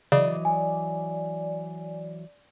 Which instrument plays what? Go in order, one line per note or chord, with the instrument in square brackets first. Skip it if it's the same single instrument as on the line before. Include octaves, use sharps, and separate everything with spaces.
[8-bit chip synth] C#3 [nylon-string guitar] E3 F#3 D#5 [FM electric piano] D5
[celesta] G#5